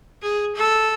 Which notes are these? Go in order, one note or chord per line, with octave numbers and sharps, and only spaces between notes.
G#4
A4